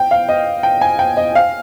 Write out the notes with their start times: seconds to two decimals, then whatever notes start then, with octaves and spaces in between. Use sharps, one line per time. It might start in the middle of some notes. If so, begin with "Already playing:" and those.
Already playing: G5
0.11 F5
0.29 D#5
0.63 G5
0.81 G#5
0.99 G5
1.17 D#5
1.35 F5